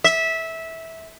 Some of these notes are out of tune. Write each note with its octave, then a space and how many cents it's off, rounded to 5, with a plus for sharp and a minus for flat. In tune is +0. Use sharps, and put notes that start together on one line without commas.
E5 -15